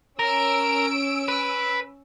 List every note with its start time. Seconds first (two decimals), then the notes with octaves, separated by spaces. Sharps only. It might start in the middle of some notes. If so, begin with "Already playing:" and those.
0.19 C#4 A#4 E6 D7
1.28 B4